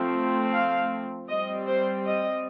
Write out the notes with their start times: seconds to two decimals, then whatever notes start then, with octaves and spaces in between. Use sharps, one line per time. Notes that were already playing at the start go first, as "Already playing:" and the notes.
Already playing: F3 A3 C4
0.52 F5
1.29 G3 C4 D#5
1.67 C5
2.06 D#5